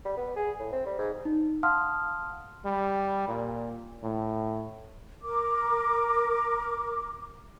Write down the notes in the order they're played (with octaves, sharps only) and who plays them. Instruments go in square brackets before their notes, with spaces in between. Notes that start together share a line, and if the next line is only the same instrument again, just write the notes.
[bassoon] G3
B3
G#4
A2
C4
G3
G#2
[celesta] D#4
F5 F#5 A5 C6 D#6 F6
[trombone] G3
A#2
A2
[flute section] A#4 D6